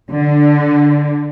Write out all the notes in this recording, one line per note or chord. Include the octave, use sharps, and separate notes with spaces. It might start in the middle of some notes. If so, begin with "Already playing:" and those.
D3